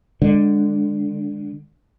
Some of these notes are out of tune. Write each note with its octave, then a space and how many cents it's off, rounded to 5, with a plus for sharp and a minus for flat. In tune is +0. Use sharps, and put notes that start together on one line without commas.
D3 +0 G#3 -15